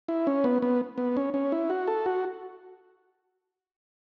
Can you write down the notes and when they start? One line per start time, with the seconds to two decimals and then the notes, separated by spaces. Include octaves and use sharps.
0.08 E4
0.27 C#4
0.44 B3
0.62 B3
0.98 B3
1.17 C#4
1.34 C#4
1.52 E4
1.70 F#4
1.87 A4
2.06 F#4